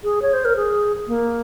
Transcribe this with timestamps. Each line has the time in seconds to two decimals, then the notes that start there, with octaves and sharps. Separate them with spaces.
0.04 G#4
0.22 C#5
0.33 C5
0.45 A#4
0.56 G#4
1.07 A#3